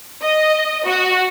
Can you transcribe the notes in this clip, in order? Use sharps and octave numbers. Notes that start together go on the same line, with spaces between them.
D#5
F#4